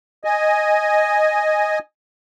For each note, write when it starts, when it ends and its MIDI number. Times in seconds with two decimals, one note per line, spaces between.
0.24 1.79 75
0.24 1.79 80